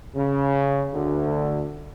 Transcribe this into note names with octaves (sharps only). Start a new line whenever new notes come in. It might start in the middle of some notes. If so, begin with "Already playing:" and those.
C#3
D2 D3